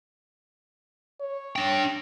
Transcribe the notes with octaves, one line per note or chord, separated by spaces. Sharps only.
C#5
D4 G5